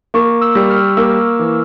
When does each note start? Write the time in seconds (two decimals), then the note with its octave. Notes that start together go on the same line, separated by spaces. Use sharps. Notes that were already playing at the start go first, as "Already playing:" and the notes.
0.14 A#3 C#6
0.41 E6
0.55 G3
0.70 F6
0.97 A#3 E6
1.39 E3